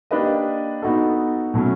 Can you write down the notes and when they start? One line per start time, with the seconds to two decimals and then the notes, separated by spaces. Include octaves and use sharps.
0.11 A#3 D4 G4 B4 D#5
0.82 B3 D#4 F#4 A4
1.54 B2 F#3 A3 C#4